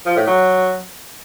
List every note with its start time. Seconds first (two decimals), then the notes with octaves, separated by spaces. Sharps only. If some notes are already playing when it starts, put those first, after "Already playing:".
0.06 F3
0.16 A2
0.27 F#3